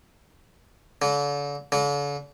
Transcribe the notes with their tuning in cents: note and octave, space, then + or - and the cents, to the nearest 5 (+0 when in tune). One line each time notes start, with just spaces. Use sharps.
D3 -40
D3 -45